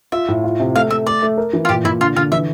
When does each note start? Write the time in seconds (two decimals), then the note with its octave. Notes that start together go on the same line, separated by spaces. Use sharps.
0.12 F4 E5
0.28 A2
0.44 F4
0.59 C3
0.75 A3 F5
0.90 A3 E5
1.06 A3 D5
1.22 A3
1.37 A#4
1.53 E3
1.65 F4
1.69 A#2 G4
1.84 A#2 E4
2.01 D3 F4
2.16 D3 F4
2.32 E3 E5